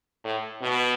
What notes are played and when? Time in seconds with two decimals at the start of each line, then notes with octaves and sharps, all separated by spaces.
0.25 A2
0.62 B2